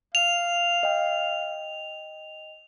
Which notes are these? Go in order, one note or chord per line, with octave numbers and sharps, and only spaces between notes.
F5 F7
D#5 G5